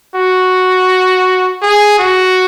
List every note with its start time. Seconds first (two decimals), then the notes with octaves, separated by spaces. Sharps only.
0.16 F#4
1.63 G#4
1.99 F#4